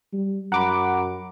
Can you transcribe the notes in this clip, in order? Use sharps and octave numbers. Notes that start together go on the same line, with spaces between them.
G3
F#2 F#5 A#5 B5 D6